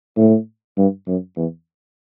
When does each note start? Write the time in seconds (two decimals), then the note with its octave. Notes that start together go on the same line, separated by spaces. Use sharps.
0.17 A2
0.77 G2
1.07 F#2
1.36 E2